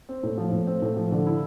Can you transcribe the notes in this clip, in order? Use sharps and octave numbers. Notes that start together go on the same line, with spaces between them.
C4
A2
F3
A2
C4
A2
F3
D3
E4